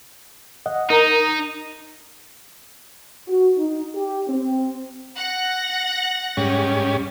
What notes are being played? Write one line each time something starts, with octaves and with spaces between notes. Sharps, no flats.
D#5 F#5
D#4 A#4 A#5
F#4
D#4
G4
C4
F#5 A#6
G#2 G3 C#4